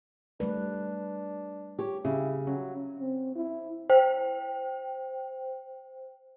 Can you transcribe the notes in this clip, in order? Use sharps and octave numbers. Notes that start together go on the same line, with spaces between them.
G3 A3 D4 B4
G4 C#5
C#3 E4 G4
F#3 C#4
C4
E4
C5 G5